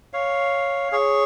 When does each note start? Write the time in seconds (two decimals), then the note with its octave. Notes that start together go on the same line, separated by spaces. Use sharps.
0.13 C#5 F5
0.92 G#4 C#5